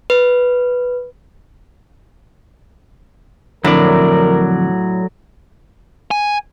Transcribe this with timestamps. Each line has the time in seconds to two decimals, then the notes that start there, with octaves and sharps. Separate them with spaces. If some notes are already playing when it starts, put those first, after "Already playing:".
0.10 B4
3.65 F2 A2 D3 F#3 A#4 D5
6.11 G#5